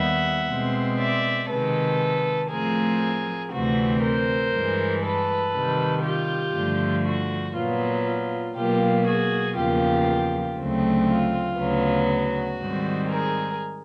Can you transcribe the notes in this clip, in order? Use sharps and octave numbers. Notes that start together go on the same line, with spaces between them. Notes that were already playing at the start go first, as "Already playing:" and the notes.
Already playing: D#2 D#3 G3 B3 E5 F#5
B2 G#3 C4
D5 E5
C3 D#3 G#3 A4 B4
A2 F3 A3 C4 G#4 A#4
D2 C3 E3 A3 C4 F#4
A#4 C5
G2 E3 G#3
A4 B4
C3 D#3 G3
F4 G4
G2 D3 F3 A3
F#4
A#2 F#3 B3 F4
F4
B2 F#3 A#3 F4 G4
F#4 G#4
E2 C#3 F3 A#3 F4 G4
D2 C#3 F#3 A3 C4
F4
D2 C#3 F#3 B3
F#4
G#2 D#3 G3 C4
G#4 A#4